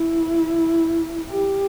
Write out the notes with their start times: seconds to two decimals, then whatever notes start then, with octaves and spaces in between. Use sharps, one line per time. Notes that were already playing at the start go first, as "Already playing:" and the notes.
Already playing: E4
1.30 G4